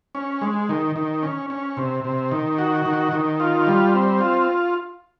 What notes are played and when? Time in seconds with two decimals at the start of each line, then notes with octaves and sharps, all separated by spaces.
0.15 C#4
0.41 G#3
0.69 D#3
0.96 D#3
1.23 C#4
1.50 C#4
1.77 C3
2.04 C3
2.32 D#3
2.58 F#4
2.86 D#3
3.13 D#3
3.40 F4
3.67 G3
3.94 C4
4.21 F4